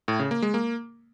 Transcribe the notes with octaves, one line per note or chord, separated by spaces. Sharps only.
A2
C#3
A#3
G#3
A#3